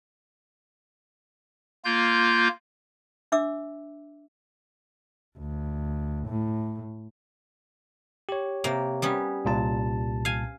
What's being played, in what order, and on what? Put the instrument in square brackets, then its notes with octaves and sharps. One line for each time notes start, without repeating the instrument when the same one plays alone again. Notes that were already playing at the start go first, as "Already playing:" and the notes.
[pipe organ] A#3 F4 G6
[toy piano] D4 E5 D6 E6
[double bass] D2
A2
[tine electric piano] G4 C#5
[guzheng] C3 A#3
G3 B3 C#4
[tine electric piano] C2 A#2 A5
[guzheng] F5 G#5